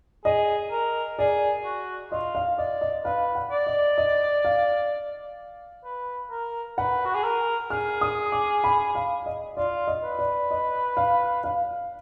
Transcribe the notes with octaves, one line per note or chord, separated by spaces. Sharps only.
G#4 D#5
A#4
G#4 D5
F#4
F4 D#5
F5
D5 D#5
D#5
B4 F5
F#5
D5
D#5
D#5
F5
B4
A#4
B4 F#5
F#4
G#4
A#4
G#4 F6
D#6
D6
B5
F5
D#5
F4 D5
D#5
B4
D5
D#5
F5
F5